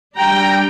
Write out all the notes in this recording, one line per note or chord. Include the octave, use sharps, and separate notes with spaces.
G3 D4 G5 A#5